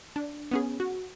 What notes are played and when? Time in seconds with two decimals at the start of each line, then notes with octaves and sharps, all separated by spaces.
0.16 D4
0.51 B3 C#4 G#4
0.80 F#4